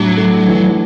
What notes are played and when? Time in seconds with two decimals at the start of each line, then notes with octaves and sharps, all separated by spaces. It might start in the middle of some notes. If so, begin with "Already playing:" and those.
Already playing: A2 F#3 D4
0.17 A3
0.48 E3